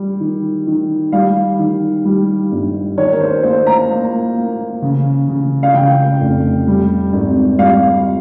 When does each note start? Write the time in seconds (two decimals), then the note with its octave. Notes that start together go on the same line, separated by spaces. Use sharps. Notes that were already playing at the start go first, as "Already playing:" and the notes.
Already playing: G3
0.20 D#3
0.67 D#3
1.12 G3 F5
1.59 D#3
2.05 G3
2.51 G1
2.97 D#2 C#5
3.12 A#4
3.21 C5
3.43 A#3 C5
3.67 A#5
3.90 A#3
4.36 A#3
4.82 C#3
5.28 C#3
5.63 F5
5.74 C#3 G5
6.21 F1
6.67 G3
7.13 G#1
7.59 G3 F5